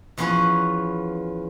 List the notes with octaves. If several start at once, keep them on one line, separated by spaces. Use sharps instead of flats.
E2 F3 B3 C#4 B4 G#5